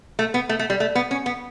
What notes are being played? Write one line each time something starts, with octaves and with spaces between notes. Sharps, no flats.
A3
B3
A3
A3
G3
A3
B3
C#4
B3